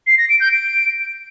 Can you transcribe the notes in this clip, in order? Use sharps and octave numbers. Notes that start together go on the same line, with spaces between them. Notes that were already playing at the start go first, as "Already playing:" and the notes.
C7
A#6
D7
G6
D7